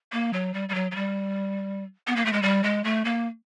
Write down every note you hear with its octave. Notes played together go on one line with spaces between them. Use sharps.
A#3
F#3
G3
G3
F#3
F#3
G3
B3
A#3
A3
G#3
G3
G#3
A3
A#3